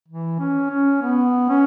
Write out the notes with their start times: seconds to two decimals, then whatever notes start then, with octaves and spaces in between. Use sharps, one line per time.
0.08 E3
0.39 C#4
0.71 C#4
1.02 B3
1.49 C#4